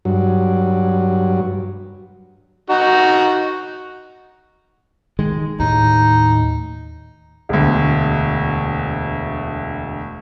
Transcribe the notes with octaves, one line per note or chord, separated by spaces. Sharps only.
G2 F#3
D#4 F#4
D#3 G#3
D#2 A2 D#4
E1 D2